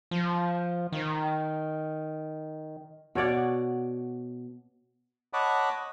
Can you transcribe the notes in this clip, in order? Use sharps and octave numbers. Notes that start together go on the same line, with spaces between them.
F3
D#3
B2 C#5 D5 F#5
C#5 D#5 F#5 A5 B5 D6